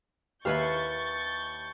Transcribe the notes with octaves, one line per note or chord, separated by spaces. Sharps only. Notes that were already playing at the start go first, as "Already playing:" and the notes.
D#2 E4 B4 F5 C#6 G6 A6